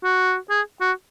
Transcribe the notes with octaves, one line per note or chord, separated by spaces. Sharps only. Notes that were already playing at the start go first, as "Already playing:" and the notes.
F#4
G#4
F#4